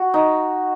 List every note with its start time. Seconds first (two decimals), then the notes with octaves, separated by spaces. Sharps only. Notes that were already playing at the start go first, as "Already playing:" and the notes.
Already playing: F#4
0.14 D#4